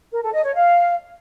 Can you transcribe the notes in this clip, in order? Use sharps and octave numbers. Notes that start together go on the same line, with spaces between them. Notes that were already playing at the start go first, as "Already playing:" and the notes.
A#4
A4
D#5
C#5
F5